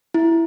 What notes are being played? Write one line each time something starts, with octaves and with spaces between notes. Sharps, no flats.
E4